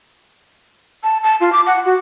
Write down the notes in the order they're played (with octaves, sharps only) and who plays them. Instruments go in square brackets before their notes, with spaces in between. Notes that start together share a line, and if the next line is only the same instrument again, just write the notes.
[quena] A5
A5
F4
D6
F#5
F#4